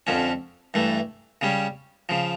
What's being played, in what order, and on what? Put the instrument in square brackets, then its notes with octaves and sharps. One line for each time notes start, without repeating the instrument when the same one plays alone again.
[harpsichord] F2 D3 F3 C#4
G2 E3 A3
C#3 G3 C#4
C#3 F3